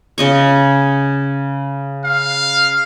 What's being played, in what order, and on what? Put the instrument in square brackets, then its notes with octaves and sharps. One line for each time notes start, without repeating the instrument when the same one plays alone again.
[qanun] C#3 D#5 C#6
[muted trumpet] F5